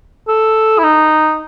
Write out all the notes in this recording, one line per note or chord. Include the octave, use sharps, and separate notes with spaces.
A4
E4
D#4